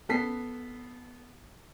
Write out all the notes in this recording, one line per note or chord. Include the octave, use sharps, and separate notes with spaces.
B3 A4 B6 C7